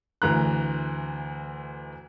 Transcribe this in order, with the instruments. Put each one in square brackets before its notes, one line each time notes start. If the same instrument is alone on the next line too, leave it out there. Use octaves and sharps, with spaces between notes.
[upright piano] D2 E3 A#5 F#6